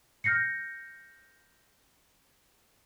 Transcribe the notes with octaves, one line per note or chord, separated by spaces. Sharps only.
F6 G6 A#6 C7 C#7